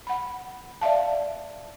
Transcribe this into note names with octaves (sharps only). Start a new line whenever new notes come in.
F#5 B5
D5 E5 F5 A5